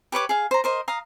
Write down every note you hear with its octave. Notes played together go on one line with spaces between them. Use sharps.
G4 B4 C#5 D6
G#4 F5
C5 A#5
A#4 C5 D#5
F5 A#5 D#6